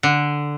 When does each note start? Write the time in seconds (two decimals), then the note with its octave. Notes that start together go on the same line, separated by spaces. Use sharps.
0.03 D3